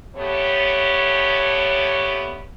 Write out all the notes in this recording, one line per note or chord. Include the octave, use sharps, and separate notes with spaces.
G2 A3 B3 G4 C#5